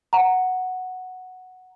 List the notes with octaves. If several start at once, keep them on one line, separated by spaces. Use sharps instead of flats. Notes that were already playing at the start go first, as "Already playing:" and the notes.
F#5 A#5